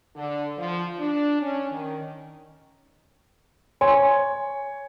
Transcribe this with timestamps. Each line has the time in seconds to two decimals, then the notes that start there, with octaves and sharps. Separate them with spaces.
0.15 D3
0.58 F3
0.99 D4
1.41 C#4
1.71 D#3
3.81 C#5 G#5 C6 C#6